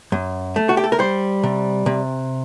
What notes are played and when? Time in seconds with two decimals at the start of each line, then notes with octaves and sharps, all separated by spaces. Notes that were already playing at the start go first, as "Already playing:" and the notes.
0.12 F#2
0.56 A3
0.69 F#4
0.77 G4
0.84 A4
0.92 A#4
0.99 G3 C5
1.43 C3
1.86 C3